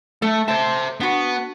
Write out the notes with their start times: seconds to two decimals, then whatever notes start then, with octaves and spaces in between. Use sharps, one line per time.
0.22 A3 A4
0.48 C5 E5 A5
1.01 B3 D4 F#4